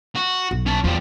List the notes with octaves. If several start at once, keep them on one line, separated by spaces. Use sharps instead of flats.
F#4
B1
C#4 A5
E2 F3 G3